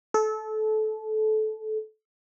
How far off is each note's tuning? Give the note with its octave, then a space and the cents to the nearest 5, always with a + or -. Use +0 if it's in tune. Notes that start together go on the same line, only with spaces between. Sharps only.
A4 -25